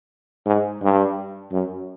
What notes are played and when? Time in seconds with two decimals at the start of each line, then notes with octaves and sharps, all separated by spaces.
0.46 G#2
0.82 G2
1.52 F#2